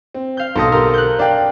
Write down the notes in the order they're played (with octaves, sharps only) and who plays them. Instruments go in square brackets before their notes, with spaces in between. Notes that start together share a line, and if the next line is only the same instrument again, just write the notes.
[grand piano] C4
[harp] F5 G6
[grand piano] B1 A4 D#6 [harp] C4 A#6
[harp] C4 G4 A#4
F#6 G6
[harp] D4 [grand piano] D5 F5 G5